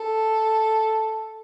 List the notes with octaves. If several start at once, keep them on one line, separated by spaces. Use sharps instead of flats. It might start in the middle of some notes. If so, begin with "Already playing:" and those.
Already playing: A4